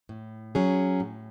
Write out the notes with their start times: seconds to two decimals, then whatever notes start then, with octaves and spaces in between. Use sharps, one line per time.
0.09 A2
0.55 F#3 C#4 G#4
1.00 A2